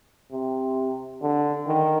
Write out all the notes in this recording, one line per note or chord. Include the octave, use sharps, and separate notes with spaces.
C3
D3
D#3